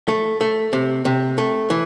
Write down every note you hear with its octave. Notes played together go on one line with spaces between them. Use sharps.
A3
A3
C3
C3
A3
E3